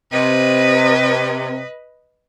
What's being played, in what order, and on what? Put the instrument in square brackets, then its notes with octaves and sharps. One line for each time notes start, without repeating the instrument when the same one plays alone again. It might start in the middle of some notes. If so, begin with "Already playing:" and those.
[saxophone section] C3 [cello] B4 D#5